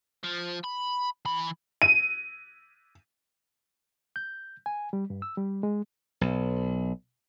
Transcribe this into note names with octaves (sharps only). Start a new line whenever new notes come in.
F3
B5
E3 B5
D#7
G6
G#5
G3
G2
E6
G3
G#3
B1